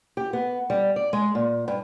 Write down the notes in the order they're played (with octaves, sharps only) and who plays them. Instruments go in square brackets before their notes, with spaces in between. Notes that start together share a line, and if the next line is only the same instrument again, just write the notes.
[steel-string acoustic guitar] G4
B3
G3
D5
G#3
A#2
G2